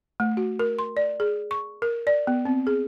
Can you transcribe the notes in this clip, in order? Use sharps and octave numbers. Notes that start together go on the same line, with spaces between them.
A3
F#4
A#4
C6
D5
G#4
C#6
A#4
D5
B3
C4
G#4